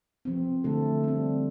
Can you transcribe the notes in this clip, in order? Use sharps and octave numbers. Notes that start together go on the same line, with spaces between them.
F3 C4
D3 A3 A4
G3 C4